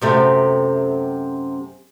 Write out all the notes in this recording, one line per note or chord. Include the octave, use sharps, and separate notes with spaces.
F#2 C3 A3